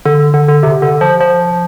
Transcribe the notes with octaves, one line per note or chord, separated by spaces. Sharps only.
D3
D3
D3
C3
D3
F3
F3